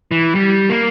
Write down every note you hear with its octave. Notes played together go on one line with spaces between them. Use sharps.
E3
G3
A#3